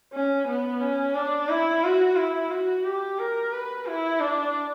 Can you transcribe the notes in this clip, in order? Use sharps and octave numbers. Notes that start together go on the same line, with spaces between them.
C#4
B3
C#4
D4
E4
F#4
E4
F#4
G4
A#4
B4
E4
D4